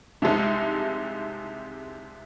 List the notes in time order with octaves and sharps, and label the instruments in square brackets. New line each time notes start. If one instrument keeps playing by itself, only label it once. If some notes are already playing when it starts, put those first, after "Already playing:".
[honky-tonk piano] C2 C3 F3 G#3 D#4